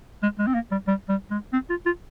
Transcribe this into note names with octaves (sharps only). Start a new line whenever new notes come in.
G#3
G#3
C4
A#3
G3
G3
G3
G#3
C4
F4
F4